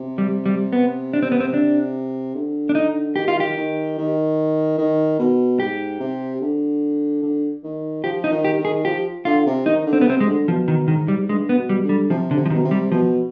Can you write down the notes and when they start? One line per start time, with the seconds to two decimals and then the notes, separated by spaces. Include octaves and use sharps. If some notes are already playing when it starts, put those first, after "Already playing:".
Already playing: C3
0.18 G3
0.46 G3
0.73 B3
1.13 D4
1.22 C4
1.32 B3
1.40 C4
1.54 D4
2.35 D3
2.69 D4
2.75 D#4
3.16 D#3 G4
3.28 F4
3.40 G4
3.57 D#3
3.98 D#3
4.78 D#3
5.19 B2
5.60 G#2 G4
6.00 C3
6.41 D3
7.22 D3
7.63 D#3
8.04 F3 G4
8.24 D#4
8.31 D#3
8.45 G4
8.58 D#3
8.65 G#4
8.85 F3 G4
9.25 D3 F4
9.47 C3
9.66 D#3 D#4
9.86 D3
9.93 C4
10.01 B3
10.07 C3 C4
10.20 G#3
10.27 D3
10.48 B2 F3
10.68 D#3
10.88 G#2 D#3
11.08 G3
11.29 G2 G#3
11.49 B3
11.55 B2
11.69 G3
11.83 D3
11.89 G3
12.10 C3 F3
12.31 D3
12.37 C3
12.46 F3
12.50 D#3
12.54 B2
12.65 C3
12.71 G3
12.91 B2 F3